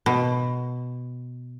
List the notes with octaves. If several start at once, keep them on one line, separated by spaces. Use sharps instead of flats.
B2